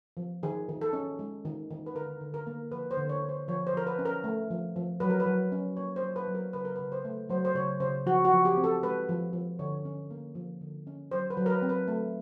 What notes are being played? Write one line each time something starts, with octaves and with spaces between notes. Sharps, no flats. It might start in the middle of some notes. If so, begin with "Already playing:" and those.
F3
D#3 G#4
D#3
A4
C#4
G#3
D#3
D#3
B4
D3 A#4
D3
A#4
A#3
F3 B4
C5
D3
C#5
D3
C5
F3 C#5
C5
F3 A#4
B4
C#4
A#4
A3
F3
F3
F#3 B4
A#4
B4
F#3
C#4
A#3 C#5
C5
F#3
B4
F#3
A#4
C#3 B4
A#4
C#3 B4
C5
A3
F#3 C5
C5
C#3 C#5
C#3 C5
F3 F#4
F#4
F3
G4
C4
A4
G#3 B4
F3
F3
D3 C#5
C#4
A#3
F3
D3
C#4
F#3 C5
B4
F#3
A#4
B4
C4
B4
A3